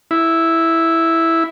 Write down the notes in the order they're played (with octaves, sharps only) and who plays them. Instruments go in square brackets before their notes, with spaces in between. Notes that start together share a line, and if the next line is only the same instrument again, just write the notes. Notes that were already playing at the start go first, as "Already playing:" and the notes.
[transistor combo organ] E4